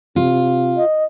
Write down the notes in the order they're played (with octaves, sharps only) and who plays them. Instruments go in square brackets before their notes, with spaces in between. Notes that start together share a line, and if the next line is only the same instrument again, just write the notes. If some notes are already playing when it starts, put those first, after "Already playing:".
[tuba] C3 [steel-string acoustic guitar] F4
[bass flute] D#5